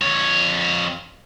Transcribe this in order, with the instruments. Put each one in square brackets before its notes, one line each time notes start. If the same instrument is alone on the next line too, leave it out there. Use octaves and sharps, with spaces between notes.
[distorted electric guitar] F2 C#5